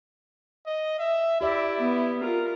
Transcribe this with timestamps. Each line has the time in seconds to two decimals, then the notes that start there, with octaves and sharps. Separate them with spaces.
0.67 D#5
0.99 E5
1.41 E4 G4 D5 E5
1.80 B3
2.21 F4 A#4